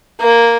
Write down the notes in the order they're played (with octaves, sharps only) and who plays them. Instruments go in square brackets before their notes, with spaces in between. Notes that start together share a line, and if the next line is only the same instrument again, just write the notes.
[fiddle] A#3